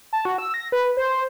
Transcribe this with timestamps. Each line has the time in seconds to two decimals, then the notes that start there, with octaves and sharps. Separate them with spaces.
0.13 A5
0.25 F#4
0.38 E6
0.54 A#6
0.72 B4
0.97 C5